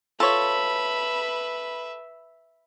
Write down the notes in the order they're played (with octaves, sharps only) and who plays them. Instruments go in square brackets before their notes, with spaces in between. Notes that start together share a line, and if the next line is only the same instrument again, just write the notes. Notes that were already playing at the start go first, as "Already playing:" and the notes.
[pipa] F4 C#5 [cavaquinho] A4 [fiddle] B4 E5 [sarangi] B5